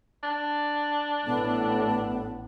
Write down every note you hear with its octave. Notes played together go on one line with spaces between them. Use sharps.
D4
A1 A2 B3